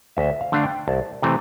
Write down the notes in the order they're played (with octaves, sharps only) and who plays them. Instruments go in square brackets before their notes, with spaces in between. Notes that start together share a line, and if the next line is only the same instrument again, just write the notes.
[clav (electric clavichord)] D2 E5
F5
D3 A3 D4 F5
G5
C2 A5
C3 E3 A3 C4